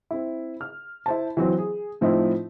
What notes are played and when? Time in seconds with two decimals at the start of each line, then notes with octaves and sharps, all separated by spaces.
0.11 C4 E4
0.61 F6
1.06 E4 C5 A5
1.37 E3 F#3 C4
1.58 G#4
2.01 A2 F3 C4 D#4 E4